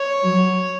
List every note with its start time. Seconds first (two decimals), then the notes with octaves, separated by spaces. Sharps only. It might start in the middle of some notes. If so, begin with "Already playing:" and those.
Already playing: C#5
0.23 F#3